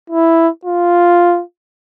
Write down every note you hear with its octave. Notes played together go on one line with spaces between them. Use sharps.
E4
F4